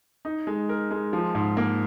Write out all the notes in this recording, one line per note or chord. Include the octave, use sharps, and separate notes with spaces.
D#4
G#3
A#4
G#3
F3
G#2
A#3